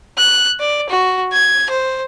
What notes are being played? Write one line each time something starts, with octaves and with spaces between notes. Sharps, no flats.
F#6
D5
F#4
G#6
C5